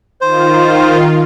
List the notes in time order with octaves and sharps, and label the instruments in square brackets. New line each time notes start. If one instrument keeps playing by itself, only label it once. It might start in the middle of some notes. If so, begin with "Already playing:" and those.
[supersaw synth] D#3 F4 [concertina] C5